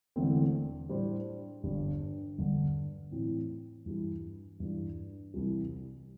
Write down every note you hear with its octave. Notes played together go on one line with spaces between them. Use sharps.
E1 E2 D3 A3 C4
A2 G3 D4 C5
G1 G2 G3 D4
G1 G2 D3
A2 E3 C4
G2 E3 G3
G2 E3 G3 D4
C2 C3 E3 G3